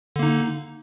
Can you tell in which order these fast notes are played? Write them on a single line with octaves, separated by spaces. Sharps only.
D3 A#3 D#4